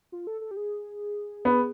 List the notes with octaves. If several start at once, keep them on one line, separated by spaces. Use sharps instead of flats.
F4
A4
A4
G4
G#4
B3